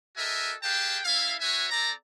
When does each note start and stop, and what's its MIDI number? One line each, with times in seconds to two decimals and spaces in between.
0.17 0.52 66
0.17 0.52 69
0.17 0.52 70
0.17 0.52 75
0.17 0.52 76
0.17 0.52 80
0.63 0.99 67
0.63 0.99 68
0.63 0.99 71
0.63 0.99 77
0.63 0.99 79
0.63 0.99 81
1.05 1.35 61
1.05 1.35 64
1.05 1.35 69
1.05 1.35 76
1.05 1.35 77
1.41 1.69 60
1.41 1.69 66
1.41 1.69 71
1.41 1.69 73
1.41 1.69 76
1.41 1.69 80
1.70 1.92 60
1.70 1.92 69
1.70 1.92 74
1.70 1.92 82